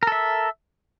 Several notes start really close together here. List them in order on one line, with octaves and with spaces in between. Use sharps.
A#4 A4 E5